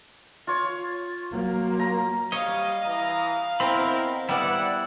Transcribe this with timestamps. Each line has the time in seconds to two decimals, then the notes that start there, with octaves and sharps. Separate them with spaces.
0.47 F4 C#5
1.31 F#3 A#3
1.79 A#5
2.32 G3 C#5 D#5 F5
2.85 E3 A#5
3.60 B3 C4 E4 A#4 D#5 A#5 B5
4.29 G3 B3 E4 D5 F#5